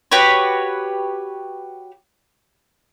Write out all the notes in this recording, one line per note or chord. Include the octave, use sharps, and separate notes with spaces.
F#4 G4 B4 C#5